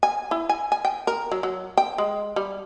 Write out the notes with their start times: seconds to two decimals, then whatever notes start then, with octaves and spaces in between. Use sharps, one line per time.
0.03 G#5
0.31 E4
0.49 G#5
0.72 G#5
0.85 G5
1.07 A#4
1.31 F#3
1.43 F#3
1.77 G5
1.98 G#3
2.36 G3